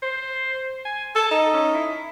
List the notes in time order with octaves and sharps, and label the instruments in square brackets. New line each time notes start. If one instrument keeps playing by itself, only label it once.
[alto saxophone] C5
G#5
[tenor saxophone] A4 [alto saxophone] A5
[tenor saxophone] D#4
[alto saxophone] C#4
E4